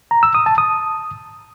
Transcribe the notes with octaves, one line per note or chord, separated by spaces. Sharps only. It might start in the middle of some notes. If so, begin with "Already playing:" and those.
A#5
E6
D#6
A5
D#6